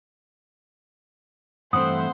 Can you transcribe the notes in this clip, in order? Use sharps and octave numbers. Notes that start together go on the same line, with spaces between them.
G2 E3 A3 C4 C5 F#5 D#6